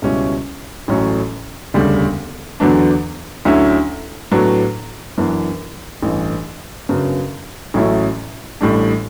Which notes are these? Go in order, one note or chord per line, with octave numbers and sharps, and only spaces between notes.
C#2 B2 G3 C#4 E4
A1 A2 F#3 C#4
E1 D2 C#3 G3
E2 D3 F#3 B3 D4
D2 D3 F#3 C#4 E4
A2 F#3 B3 D4
F#2 E3 B3 D4
A1 G2 E3
F#2 C#3 F#3 B3 D4
A1 A2 F#3 C#4 E4
A1 A2 G3 D4